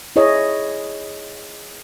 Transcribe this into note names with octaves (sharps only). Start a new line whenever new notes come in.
E4 G#4 C#5 D#5